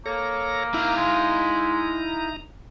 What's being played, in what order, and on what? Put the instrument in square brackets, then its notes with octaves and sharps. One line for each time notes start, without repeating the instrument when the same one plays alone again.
[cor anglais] A#3 [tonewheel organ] A4 C#5 A#6
[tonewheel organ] D#4 A#5 [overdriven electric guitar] E4 F5
[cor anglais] G#3